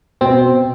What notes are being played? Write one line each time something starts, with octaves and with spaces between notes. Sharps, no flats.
B2 C4